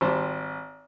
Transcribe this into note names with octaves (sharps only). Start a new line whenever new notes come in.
G#1 G3 C5 A5